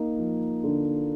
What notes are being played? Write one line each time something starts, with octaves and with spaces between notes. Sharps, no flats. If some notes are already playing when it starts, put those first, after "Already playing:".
Already playing: A#3 D#4
F3
D3